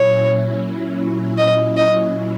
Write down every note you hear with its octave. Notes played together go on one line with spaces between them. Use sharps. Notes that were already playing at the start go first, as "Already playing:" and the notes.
Already playing: A#2 F#3 C#4 E4 C#5
D#5
D#5